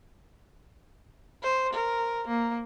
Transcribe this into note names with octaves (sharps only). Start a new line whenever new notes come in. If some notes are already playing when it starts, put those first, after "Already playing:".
C5
A#4
A#3